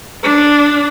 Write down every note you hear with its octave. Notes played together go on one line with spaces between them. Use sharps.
D4